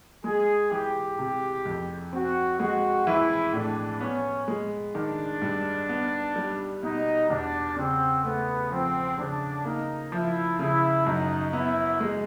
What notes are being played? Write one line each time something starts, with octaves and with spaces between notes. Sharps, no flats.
G#3 G#4
E3 G4
C3
F2
C4 F#4
G#3 F#4
E3 E4
A2 D4
B3 C#4
G#3
D#3 D4
G2
B3
G3
B2 D#4
E2 D4
C#3 C4
A3 B3
F3 C4
C#3 D4
A#3 D#4
F3 E4
C#3 E4
F#2 D#4
B3 E4
G#3